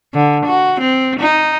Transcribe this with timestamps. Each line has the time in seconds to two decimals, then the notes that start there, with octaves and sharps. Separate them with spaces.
0.14 D3
0.46 F#4
0.81 C4
1.20 D#4